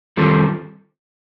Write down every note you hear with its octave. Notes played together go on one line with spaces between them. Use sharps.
D#3 G3 C4 F4 A4